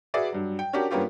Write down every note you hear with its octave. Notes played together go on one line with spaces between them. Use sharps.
F#4 G#4 B4 D5 E5
G2 F#3
G5
C#4 D4 F#4 G4 A#4
G2 A#3 B3 C#4 F4 G4